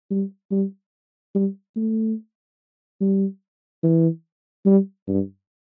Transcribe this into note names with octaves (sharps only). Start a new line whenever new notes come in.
G3
G3
G3
A3
G3
E3
G3
G2